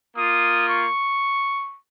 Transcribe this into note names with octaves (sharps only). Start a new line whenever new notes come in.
A#3 F4 D#6
C#6